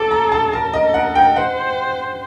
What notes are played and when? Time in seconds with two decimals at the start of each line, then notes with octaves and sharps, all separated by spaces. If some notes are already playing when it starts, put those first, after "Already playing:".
Already playing: A4 D6
0.11 A#5
0.32 A5
0.52 A#4 A5
0.74 D#5
0.94 F#5
1.15 G5
1.36 C5 F#5